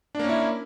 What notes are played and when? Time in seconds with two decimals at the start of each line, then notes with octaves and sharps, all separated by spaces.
0.15 D4
0.19 A#3
0.24 C#4
0.29 E4